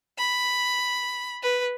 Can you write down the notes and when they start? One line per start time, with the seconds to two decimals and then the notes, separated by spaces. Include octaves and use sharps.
0.18 B5
1.43 B4